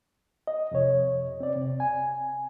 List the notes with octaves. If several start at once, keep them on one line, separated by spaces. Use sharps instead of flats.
D#5
F2 C3 C#5
C4 D5
C3
G#5